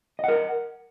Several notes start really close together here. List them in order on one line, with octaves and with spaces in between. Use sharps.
D#5 F#5 A#4